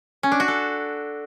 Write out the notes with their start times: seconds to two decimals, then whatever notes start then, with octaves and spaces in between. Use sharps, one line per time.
0.23 C#4
0.32 D4
0.40 F#4
0.48 A4